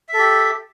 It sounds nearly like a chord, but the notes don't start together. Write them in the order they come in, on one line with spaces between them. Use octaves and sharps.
E5 A4 G4